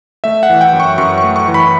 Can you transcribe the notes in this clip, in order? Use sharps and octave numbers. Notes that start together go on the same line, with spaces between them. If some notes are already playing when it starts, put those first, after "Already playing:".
A3 E5
F#5
E3
G5
F#2
C#6
F#2 C#6
C#6
A3
C#6
E3
B5